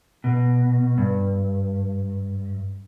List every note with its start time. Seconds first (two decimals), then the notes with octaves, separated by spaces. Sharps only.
0.24 B2
0.98 G2